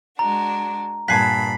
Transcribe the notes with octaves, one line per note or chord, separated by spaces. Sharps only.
G#3 D4 F#4 A#5
G2 A#2 F#5 G#5 A5 B5 B6 C7